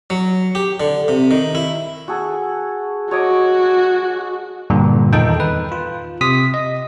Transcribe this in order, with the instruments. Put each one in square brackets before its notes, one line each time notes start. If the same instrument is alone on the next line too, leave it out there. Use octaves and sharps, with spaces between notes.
[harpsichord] F#3
G4
D3
C3
D#3
E4
[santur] F#4 G#4 A4
[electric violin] F#4 [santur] C#5 D#5 D6
[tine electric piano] G2 A#2 D3
E2 D#3 D#4 A4 G5
B4
F4
C3 D#6 B6
D#5